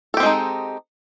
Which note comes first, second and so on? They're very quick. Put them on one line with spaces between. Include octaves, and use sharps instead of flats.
A4 G4 C4 G#3 D#4